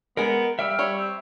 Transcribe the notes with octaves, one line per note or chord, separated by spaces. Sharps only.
G#3 B3 G#4 A#4
G3 E5 F5 G5 E6
G3 C#5
C4